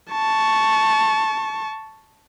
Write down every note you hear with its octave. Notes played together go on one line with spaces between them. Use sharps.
A5 C#6